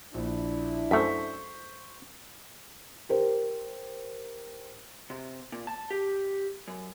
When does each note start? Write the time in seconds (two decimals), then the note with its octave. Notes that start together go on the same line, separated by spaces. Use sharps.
0.14 A#1 D4 E4
0.91 F#2 A3 C5 C#6 B6
3.09 G4 A#4 C5
5.10 C3
5.52 A#2
5.67 A5
5.90 G4
6.68 F#2